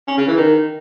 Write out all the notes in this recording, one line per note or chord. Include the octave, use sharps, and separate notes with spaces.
C#4
C#3
E3
D#3